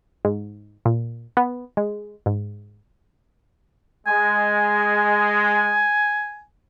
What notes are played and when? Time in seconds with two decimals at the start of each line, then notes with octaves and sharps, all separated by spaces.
0.25 G#2
0.85 A#2
1.37 B3
1.77 G#3
2.26 G#2
4.07 G#3 G#5